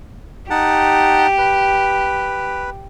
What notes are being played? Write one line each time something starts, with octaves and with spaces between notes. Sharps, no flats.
D#4 G4 F#5 A5
B4